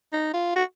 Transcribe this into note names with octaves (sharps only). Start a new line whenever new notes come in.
D#4
F4
F#4